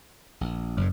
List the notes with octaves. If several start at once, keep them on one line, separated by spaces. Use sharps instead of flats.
A#1
F#1 F#2 A2